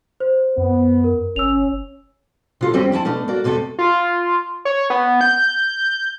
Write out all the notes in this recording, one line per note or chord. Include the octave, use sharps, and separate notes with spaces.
C5
F#2 B3
A#4
G1 C#4 E6 F7
C3 F4 A4
D#2 G3 C4 C#4 G5
F3 E4 G#5 A5
B2 A3 D4
A#3 F#4 D5
E2 C3 A3 F#4 A4
F4
C#5
B3
G6